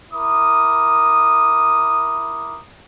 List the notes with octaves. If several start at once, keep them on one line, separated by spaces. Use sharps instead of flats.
E4 A#4 D6 D#6